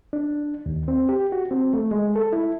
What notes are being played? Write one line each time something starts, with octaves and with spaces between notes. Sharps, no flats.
D4
D#2
C4
G4
F#4
C4
A3
G#3
A4
E4